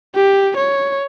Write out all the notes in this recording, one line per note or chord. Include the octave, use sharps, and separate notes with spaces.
G4
C#5